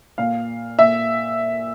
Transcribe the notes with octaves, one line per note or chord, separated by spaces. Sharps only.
A#2 F5
A#2 E5